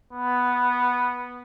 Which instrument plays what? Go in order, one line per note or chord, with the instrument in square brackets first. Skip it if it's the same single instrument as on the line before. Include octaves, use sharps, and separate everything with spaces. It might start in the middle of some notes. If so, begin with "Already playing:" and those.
[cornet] B3